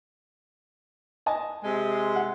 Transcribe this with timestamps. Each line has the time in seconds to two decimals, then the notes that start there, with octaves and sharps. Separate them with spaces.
1.26 D#5 G#5 A5
1.63 C3 G#3
2.16 F#5